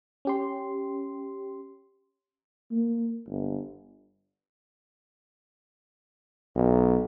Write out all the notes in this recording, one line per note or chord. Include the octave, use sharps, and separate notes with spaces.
C#4 G4 C6
A#3
G1
B1